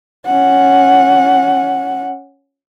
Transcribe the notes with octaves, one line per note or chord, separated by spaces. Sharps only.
C#4 F#5